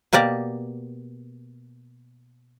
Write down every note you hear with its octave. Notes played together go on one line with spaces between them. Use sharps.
B2 A#3 G4 D5 A#5